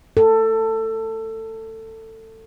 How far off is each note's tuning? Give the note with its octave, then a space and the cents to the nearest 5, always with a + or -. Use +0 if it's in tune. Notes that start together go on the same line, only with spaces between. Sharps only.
A4 +20